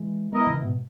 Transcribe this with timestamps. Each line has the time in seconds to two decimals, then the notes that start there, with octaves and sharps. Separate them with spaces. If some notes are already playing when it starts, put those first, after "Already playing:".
Already playing: E3 G#3
0.32 G#3 B3 E4 A#4 D#5
0.47 C#3 E3
0.61 G#2 B2